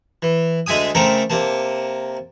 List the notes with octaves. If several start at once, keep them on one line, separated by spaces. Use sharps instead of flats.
E3
D2 G#3 E5 G#5 D#6
C#3 A3 C4 A4 A#4
C3 A#3 A5